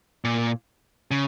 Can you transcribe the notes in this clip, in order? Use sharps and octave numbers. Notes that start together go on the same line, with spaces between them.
A#2
C#3